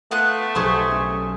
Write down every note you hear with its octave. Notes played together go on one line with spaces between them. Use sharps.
A3 B3 F4 F#6
B1 G4 G#4 C5 C6 C#6
C#4